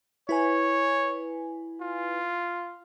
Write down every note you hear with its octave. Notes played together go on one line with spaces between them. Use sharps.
E4 B4 C#5 G#5
F4